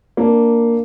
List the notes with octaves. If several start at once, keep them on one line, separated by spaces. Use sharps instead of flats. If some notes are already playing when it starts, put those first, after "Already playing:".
A#3 D4